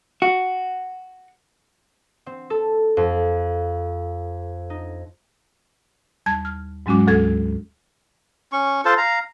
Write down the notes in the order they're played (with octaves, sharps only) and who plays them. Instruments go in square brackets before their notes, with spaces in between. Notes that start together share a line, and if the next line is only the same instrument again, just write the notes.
[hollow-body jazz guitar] F#4
[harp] C4
A4
F2
D#4
[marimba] D#2 G3 A5 G#6
F6
G#2 F#3 G#3 C#4 F#4 D6
D2 A4 G#6
[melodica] C#4 C#6
F4 A4 C5 A5
F5 A#5